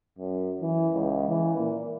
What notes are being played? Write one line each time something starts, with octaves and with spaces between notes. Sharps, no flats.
F#2
E3
C#2
E3
A#2